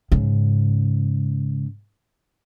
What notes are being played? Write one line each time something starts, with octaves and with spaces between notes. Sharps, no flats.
G#2 C#3